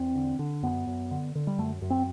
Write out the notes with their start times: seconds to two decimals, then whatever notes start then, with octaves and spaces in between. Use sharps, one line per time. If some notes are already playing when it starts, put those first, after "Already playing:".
Already playing: E2 C4
0.15 D3
0.39 D3
0.63 F#2 B3
0.87 F#2
1.11 D3
1.35 D3
1.47 G3
1.58 F#2 A3
1.82 F#2
1.90 C4